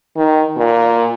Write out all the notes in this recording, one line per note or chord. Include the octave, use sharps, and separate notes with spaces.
D#3
A#2